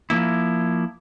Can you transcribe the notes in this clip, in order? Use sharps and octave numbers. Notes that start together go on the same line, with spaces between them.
F3 A#3 E4